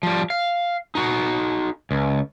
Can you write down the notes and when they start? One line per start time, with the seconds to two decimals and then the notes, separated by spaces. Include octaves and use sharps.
0.03 F3 G3
0.30 F5
0.95 D#4 F#4
1.91 C#2